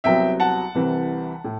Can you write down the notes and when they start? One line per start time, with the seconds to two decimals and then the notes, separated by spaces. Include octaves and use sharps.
0.04 C2 C3 F#3 B3 E5 G5
0.40 F#5 A5
0.75 C2 C3 E3
1.44 A2